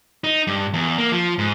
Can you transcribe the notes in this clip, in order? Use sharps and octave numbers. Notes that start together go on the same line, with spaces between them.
D#4
G2
E2
A#3
F3
G#2